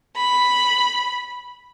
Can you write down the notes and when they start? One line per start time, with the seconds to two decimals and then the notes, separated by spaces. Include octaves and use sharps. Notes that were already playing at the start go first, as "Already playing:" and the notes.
0.17 B5